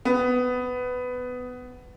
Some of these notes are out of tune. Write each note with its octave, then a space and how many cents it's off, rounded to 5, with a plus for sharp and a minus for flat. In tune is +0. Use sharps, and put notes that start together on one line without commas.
B3 +15